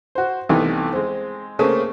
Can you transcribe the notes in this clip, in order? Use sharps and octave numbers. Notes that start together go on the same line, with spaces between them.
F#4 C5
C2 C3 E3 A3 B3 D#4
G#3 C4
C#3 A3 A#3 C4